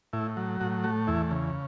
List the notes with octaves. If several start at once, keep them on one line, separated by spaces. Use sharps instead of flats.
A2 E4
F#3
A2 F#4
A3 F#4
E2 E4
C#3